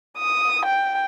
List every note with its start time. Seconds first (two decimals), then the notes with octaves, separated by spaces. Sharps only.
0.18 D#6
0.66 G5